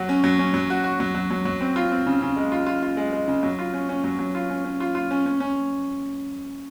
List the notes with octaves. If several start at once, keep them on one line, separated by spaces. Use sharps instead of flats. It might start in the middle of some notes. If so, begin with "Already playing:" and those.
Already playing: F#3 F#4
C#4
F#3
C#4
F#3
F#4
F#4
F#3
F#3
F#3
F#3
C4
F4
C4
C#3
C#3
G#3
F4
F4
F4
G#3
G#3
C#3
F#3
F4
C#4
C#4
F#3
F#3
F4
C#4
C#4
F4
F4
C#4
C#4
C#4